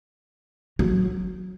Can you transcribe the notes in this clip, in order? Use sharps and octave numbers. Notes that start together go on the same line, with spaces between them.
F#3